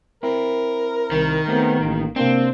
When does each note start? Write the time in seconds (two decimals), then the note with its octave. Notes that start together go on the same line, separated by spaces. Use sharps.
0.23 C4 E4 A#4
1.11 C2 D#3
1.48 A3 B3 C4 G4
1.81 A1 A#3
2.16 C3 A#3 C4 D4